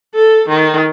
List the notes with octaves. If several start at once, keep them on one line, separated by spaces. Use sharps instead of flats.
A4
D#3